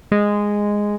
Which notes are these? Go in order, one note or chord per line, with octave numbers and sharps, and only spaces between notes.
G#3